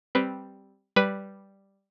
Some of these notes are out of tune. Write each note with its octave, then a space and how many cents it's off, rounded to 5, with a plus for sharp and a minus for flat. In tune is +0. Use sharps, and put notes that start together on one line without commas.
G3 +0 C4 +0 B4 +0
G3 +0 B4 +0